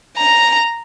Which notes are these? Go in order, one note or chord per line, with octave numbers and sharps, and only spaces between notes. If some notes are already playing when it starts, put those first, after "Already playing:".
A#5